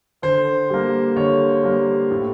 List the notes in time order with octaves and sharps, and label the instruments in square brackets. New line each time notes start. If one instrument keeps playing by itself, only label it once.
[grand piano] D3 C5
G3 A#3
D3 C#5
G3 A#3
A2